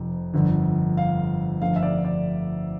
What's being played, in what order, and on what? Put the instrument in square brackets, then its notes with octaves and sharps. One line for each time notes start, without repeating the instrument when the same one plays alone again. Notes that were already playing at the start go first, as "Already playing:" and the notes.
Already playing: [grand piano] F1 F2 C3
G1 F2 D3
F5
G1 F2 D3 A3 F5
E5
D5
D5